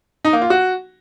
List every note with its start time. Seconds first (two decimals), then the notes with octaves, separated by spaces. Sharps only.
0.25 D#4
0.33 A#3
0.42 F4
0.50 F#4